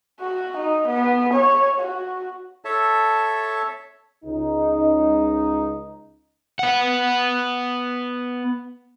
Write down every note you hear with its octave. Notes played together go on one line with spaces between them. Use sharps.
F#4
D#4
B3
C#5
F#4
A4 C#5 E5 A5
C#2 D#4
B3 F#5